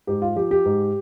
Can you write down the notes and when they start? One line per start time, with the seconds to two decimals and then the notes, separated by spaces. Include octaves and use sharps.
0.07 G#2 G4
0.22 F4
0.36 F3 G4
0.51 G4
0.65 G#2